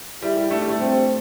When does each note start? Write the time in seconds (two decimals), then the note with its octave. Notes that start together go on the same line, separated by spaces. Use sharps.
0.22 G3 E4
0.37 G3
0.51 A3 D4
0.61 G3
0.69 A3
0.79 C4